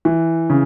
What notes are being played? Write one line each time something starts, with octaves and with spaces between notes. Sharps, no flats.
E3
C#3